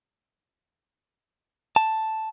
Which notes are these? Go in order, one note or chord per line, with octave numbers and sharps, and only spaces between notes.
A5